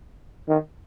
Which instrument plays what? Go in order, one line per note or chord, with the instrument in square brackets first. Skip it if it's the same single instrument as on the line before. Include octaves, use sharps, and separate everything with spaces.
[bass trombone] D#3